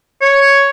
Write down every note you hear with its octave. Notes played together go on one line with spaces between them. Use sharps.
C#5